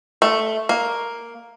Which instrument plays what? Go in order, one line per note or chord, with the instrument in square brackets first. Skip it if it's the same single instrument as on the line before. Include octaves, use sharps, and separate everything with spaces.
[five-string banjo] A3
A#3